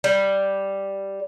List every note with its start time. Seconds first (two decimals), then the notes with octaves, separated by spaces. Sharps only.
0.04 G3